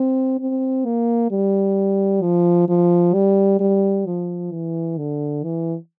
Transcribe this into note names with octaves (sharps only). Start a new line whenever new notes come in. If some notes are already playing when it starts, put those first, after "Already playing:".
Already playing: C4
C4
A#3
G3
F3
F3
G3
G3
F3
E3
D3
E3